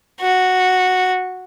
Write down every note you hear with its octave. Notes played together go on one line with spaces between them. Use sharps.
F#4